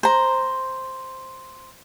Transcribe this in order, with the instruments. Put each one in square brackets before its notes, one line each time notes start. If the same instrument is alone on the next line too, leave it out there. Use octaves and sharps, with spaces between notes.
[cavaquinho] C5 A#5